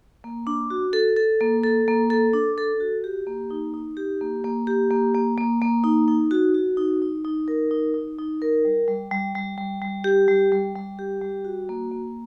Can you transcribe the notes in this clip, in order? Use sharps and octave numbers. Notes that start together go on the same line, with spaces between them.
A#3
D4
F#4
A4
A4
A#3
A4
A#3
A4
D4
A4
F#4
G4
A#3
D#4
D#4
G4
A#3
A#3
G4
A#3
A#3
A#3
A#3
D#4
D#4
F#4
F#4
D#4
D#4
D#4
A#4
D#4
D#4
D#4
A#4
G3
G3
G3
G3
G3
G3
G4
G3
G3
G3
G4
G3
F#4
A#3
A#3